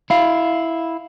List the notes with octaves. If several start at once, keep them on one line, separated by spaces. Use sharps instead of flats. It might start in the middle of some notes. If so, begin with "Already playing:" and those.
E4 F5